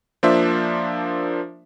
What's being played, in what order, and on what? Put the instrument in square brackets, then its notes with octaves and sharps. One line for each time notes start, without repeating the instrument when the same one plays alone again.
[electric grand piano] F3 A#3 D4 F4 C5 E5